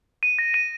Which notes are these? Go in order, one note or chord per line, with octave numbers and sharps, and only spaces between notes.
D#7
A#6
D#7